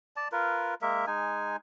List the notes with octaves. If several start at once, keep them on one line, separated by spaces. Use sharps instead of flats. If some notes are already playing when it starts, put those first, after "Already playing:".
D5 A5
F4 A#4 B4
G#3 A#3 A#4 E5
G#3 D#4 G#5